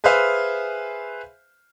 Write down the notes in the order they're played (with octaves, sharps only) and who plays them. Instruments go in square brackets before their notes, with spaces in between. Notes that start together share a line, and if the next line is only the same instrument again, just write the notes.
[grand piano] G#4 B4 C5 E5 F5 G#5